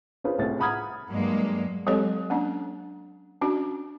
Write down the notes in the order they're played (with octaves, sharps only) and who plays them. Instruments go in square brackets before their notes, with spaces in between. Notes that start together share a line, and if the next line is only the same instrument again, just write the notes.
[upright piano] C#4 F4 G#4 B4 C5
C2 A2 G#4 A6
F#5 A#5 B5 D#6 F6 G#6
[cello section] G2 F#3 G#3 A#3
[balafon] F#3 G#3 C4 G4 A4 C#5
A#3 C#4 D4
C#4 D4 F#4